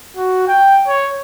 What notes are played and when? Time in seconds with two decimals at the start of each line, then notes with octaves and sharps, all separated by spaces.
0.17 F#4
0.48 G5
0.88 C#5